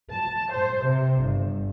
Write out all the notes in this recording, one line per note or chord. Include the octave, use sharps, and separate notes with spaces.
A5
C5
C3
G1